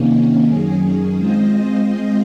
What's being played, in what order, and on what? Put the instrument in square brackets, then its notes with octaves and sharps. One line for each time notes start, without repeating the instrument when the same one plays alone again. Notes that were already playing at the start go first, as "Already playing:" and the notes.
Already playing: [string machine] C3 D#3 A#3 C#4
F#2 D#3 F#3 C#4 G#4
G#3 C4 F4 C5 D#5